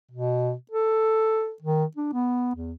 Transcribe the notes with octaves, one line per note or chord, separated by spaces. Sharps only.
B2
A4
D#3
D4
B3
E2